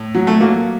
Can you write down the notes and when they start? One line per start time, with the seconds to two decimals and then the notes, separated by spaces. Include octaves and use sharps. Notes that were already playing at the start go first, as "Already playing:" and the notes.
Already playing: A2
0.15 F#3
0.27 A3
0.40 F#3 A#3